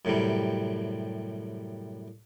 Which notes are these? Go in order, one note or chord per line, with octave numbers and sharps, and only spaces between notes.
F#2 A2 C3 G3